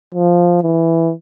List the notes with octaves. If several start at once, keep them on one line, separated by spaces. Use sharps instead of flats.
F3
E3